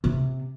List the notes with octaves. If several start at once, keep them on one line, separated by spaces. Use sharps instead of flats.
C3